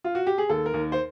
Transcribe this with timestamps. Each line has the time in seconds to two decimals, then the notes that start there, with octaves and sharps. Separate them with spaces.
0.04 F4
0.15 F#4
0.27 G4
0.38 G#4
0.49 D#2 A4
0.66 A#4
0.74 D#2
0.92 C5